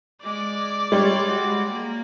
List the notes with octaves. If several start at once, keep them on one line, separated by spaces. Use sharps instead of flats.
G#3 D5 D6
G3 G#3 C#5
F#4
A#3